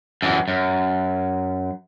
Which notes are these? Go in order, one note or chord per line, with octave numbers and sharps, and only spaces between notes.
F#2 E3
F#2